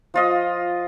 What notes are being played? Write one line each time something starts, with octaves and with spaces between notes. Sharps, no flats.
F3 F4 D#5